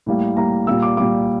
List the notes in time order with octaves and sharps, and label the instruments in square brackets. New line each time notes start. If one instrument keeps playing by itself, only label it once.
[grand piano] A2 G3 A#3
A2 G3 A#3 A#5
A#2 G3 A#3 E6
D6
A#2 G3 A#3 D6